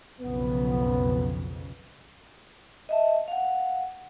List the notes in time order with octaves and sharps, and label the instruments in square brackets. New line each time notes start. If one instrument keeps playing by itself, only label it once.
[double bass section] B1 F2 C#3 [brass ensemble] B3
[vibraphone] D#5 E5 A5
F5 F#5